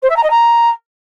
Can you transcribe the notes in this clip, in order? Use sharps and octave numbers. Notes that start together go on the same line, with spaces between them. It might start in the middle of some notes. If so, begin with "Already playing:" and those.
C5
E5
A#5
D#5
A#5